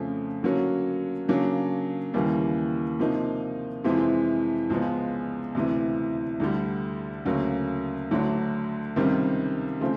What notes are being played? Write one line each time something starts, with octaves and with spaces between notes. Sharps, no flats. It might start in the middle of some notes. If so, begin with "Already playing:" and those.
Already playing: F2 C#3 F3 A3
D3 F#3 A#3 C#4 F#4
C#3 F#3 A#3 D4
D#2 C#3 E3 G3 A#3
C3 F3 A#3 D#4
F2 C3 E3 G#3 C4
C#2 C#3 F3 G#3 B3
D2 C3 E3
D2 D3 G3
D2 C#3 F#3 A#3
D2 D3 F#3 A3 D4
C#2 C3 D#3 G3 C4
C#3 F3 A3 C4